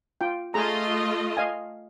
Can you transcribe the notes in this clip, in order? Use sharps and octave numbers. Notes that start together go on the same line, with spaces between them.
F4 G5
A3 F4 G#4 D#5 A#5
D#5 F5 G#5